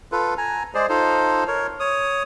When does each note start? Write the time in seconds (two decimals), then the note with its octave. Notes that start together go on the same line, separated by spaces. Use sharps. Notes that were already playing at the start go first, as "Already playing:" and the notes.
0.12 F4 A4 B4
0.38 G#5 A#5
0.74 G#3 G#4 C5 D5
0.89 D#4 F4 A4 C5
1.48 A#4 C#5
1.80 C#5 D#6